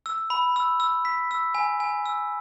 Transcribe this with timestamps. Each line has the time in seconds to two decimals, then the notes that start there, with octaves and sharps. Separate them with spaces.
0.06 E6
0.30 B5
0.56 E6
0.80 E6
1.05 B6
1.31 E6
1.55 G#5
1.80 G#5
2.06 E6